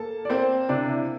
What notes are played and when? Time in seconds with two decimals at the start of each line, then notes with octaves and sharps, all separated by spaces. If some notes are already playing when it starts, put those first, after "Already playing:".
Already playing: A#3 A4 A5
0.25 D5
0.30 A#3 C4 C5
0.69 C3 D4 D5
0.89 E4